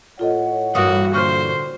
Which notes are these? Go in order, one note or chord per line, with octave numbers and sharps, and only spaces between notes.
A2 F4 A4 C#5 D#5 F#5
G2 E3 A#3 F#4 D#6
A#2 D3 C5 C#6 F6